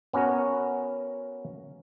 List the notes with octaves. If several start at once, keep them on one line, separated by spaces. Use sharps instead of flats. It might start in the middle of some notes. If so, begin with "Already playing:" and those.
B3 C#4 F#4 A#4